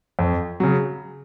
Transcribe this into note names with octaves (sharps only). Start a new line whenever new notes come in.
F2
C#3 F#3